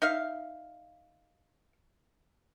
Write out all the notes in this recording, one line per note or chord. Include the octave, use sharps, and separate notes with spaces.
D#4 E5 F5